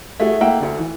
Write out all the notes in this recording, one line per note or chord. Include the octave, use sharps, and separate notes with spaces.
A3 E4 F#4 G#4
A3 A#3 E4 E5 F#5 G5
D2 D3
E3